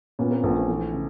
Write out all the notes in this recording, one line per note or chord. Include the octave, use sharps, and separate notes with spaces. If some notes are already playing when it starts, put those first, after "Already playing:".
A#2 B3 C#4
A#3 C4
A#1 A3 B3
A3 B3
E3 A3
C#3